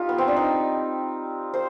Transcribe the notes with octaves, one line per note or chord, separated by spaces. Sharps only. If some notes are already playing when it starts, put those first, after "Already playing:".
Already playing: D#4 F4 G4
B3
C4
D4
D#4
C5